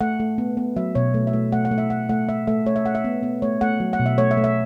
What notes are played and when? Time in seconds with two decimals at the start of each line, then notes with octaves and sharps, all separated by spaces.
0.01 A3 F#5
0.20 A3
0.38 B3
0.57 B3
0.76 F#3 E5
0.95 B2 C#5
1.14 A3
1.27 E5
1.33 A3
1.52 A3 F#5
1.65 F#5
1.71 A3
1.78 E5
1.90 A3 F#5
2.09 A3 F#5
2.28 A3 E5
2.47 A3 E5
2.66 A3 C#5
2.76 E5
2.85 A3 F#5
2.95 E5
3.04 B3
3.23 B3
3.42 A3 C#5
3.61 A3 F#5
3.80 F#3
3.93 F#5
4.00 B2
4.06 E5
4.18 A3 C#5
4.31 E5
4.37 A3
4.44 E5